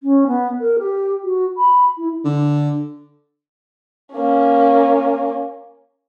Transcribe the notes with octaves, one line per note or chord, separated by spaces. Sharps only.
C#4
B3
A#4
G4
F#4
B5
E4
D3
A#3 C#4